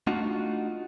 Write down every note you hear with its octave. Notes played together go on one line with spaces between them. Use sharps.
A3 D4 D#4 F4 F#4